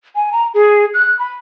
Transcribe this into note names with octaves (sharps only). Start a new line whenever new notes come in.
G#5
A#5
G#4
F#6
B5